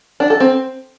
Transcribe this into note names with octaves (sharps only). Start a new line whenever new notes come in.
D4
A4
C4